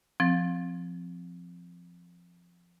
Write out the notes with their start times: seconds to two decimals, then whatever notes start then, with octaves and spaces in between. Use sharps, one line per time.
0.20 F3 C4 A6